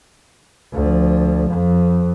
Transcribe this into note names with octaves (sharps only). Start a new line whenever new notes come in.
D2 F3
F2